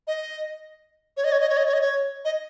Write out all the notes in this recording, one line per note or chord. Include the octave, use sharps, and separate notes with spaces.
D#5
C#5
D#5
C#5
D#5
C#5
D#5
C#5
D#5
C#5
D#5